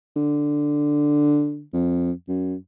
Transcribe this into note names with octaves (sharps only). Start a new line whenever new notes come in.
D3
F2
F#2